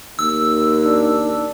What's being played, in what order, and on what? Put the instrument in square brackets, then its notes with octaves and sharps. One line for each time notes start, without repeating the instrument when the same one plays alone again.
[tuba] D#2 [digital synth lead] E6
[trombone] D4